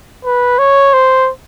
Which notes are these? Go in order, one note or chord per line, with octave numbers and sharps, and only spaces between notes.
B4
C#5
C5